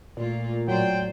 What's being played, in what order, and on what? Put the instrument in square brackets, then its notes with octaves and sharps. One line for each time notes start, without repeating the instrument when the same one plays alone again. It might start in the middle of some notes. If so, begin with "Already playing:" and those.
[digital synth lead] A#2 [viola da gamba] A3 A#3 F4
[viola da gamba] A2 C5 D5 [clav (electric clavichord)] F#3 [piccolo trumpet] G5